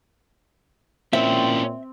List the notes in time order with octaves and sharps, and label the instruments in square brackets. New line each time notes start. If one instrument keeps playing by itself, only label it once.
[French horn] A#2 [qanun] C4 [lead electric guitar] C#4 E4 [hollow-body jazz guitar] E5